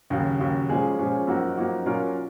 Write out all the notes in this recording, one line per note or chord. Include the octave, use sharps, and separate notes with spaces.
D#2 C#3 F#3
D#2 C#3 F#3
A#2 F3 G#3 C#4 G#4
A#2 F3 G#3 C#4 G#4
F#2 F3 A#3 D#4 F#4
F#2 F3 A#3 D#4 F#4
A#2 F#3 C#4 F4 A#4